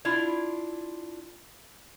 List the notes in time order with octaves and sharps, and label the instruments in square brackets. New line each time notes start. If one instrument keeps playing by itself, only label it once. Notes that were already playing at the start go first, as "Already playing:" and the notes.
[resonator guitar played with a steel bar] D4 E4 F4